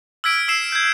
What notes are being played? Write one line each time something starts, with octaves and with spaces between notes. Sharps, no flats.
E6 F6 G#6 B6 D7
E6 C7 E7
G6 G#6